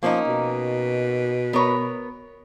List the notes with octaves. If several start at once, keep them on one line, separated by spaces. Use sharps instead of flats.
F3 A#3 C#4 D#4
B2
B3 A#4 C#5